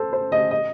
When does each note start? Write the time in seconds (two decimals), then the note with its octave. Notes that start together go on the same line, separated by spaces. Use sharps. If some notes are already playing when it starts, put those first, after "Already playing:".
Already playing: A4 C5
0.13 C5
0.32 D#5
0.51 D#5